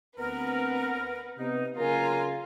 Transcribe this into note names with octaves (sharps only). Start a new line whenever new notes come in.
D2 B3 C4 A#4 B4 F#5
C3 B3 D#4
C#3 F#3 A#3 F4 A#4 G#5 A#5